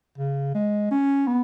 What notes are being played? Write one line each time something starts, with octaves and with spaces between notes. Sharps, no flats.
C#3
G#3
C#4
B3